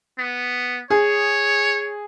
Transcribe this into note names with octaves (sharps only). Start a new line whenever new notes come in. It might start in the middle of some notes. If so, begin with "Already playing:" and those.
B3
G#4 C#5